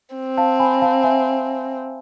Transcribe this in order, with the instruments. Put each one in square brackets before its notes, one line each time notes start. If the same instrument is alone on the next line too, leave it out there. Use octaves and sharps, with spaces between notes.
[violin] C4
[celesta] F5 A5
G#5 B5
F5 A5
E5 G#5